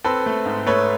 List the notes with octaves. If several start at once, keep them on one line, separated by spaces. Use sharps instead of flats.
C4 A4 B4
A3
G#2
A3 B4 C#5